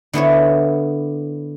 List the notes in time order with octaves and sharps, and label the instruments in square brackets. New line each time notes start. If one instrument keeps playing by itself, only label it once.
[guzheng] D3 B3 E4 C#5